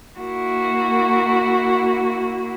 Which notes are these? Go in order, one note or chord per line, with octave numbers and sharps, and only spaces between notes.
A#3 E4 F#4